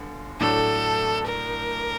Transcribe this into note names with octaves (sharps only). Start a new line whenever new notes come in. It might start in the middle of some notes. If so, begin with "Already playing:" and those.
Already playing: G1 D3
A2 F#3 A3 D4 A4
A#4